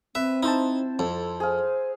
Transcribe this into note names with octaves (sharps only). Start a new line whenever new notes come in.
C4 B4 E5
D#4 E4 C5 A5
F2 A4
G#4 C5 F5